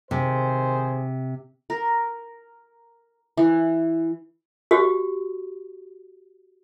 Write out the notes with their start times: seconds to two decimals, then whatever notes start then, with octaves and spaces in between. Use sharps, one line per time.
0.11 C3 D#3 G#4 C5
1.70 A#4
3.37 E3
4.71 F#4 G4